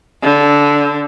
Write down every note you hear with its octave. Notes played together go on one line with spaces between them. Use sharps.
D3